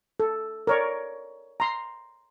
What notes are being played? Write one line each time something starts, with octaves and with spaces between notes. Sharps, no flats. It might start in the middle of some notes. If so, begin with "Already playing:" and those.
A4
A#4 C#5 D5
A#5 C6